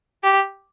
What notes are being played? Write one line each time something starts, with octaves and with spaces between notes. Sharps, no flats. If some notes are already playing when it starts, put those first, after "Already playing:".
G4